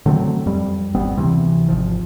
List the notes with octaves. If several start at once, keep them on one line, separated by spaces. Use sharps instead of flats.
D3 F#3 A3 C4
F2 G3
G#1 G3 B3 C4
D2 C3 E3
G#1 F3